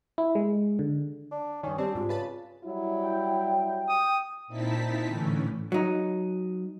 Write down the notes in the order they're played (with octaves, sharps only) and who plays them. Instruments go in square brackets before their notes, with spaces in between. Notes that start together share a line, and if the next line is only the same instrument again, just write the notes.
[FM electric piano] E4
G#3
D3
[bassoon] D4
[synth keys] G2 D#3 [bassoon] C#4
[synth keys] G3 C4 [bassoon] D4 [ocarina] G4
[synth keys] G#2 [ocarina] F4
[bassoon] C#3 [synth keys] B4 A5 B5
[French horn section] F#3 G3 E4
[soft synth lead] G5
[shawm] D#6
[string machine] A#2 C4 D#4 E4 A5 B6
A2 D3 E3 A3 C#4
[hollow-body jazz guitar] F#3 D#4